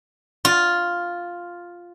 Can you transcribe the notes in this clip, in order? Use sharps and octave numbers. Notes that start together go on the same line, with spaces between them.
F4